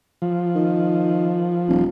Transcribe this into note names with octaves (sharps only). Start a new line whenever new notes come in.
F3
D#3
D#1